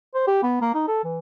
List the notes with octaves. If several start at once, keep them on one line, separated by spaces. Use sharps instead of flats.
C5
G4
B3
A#3
D#4
A4
E3